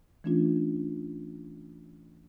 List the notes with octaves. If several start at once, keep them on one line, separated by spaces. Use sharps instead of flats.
E3 A3 C#4 D4 F4